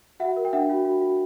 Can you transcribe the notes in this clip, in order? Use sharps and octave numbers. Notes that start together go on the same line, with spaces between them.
F#4 E5 F#5
A#4
G5
D4 E5 F#5
F#4
F#4
F#4